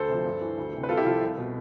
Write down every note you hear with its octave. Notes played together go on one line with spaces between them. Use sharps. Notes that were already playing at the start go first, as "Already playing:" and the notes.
Already playing: D2 A4 C5
C3 F3
G2
E3
D2
C3 E3
B4
C2 F4 A4
E4 G4
C3 F3 F4 A4
C2
B2